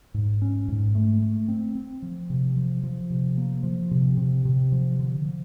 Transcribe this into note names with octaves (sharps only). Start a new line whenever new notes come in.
G#2
C#4
G#2
A3
A3
C4
C4
F3
C3
F3
F3
C3
A#3
F3
C3
C3
C3
F3
D3
F3